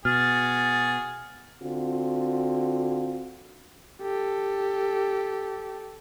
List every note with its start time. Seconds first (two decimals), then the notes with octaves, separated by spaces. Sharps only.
0.05 B2 F#4 G#4 F6 A6
1.63 D3 C4 F4 F#4
4.02 G4 A4